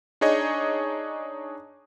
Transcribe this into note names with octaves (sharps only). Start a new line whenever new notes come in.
D4 D#4 G#4 C#5 D#5